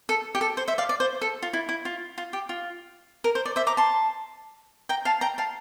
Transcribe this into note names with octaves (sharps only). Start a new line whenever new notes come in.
A4
G4
A4
C5
C5 E5
D5 F5
D5
C5
A4
F4
E4
E4
F4
F4
G4
F4
A#4
C5
D5
C5 E5
A#5 D6
A5 C6
G5 A#5
F5 A5
G5 A#5
F5 A5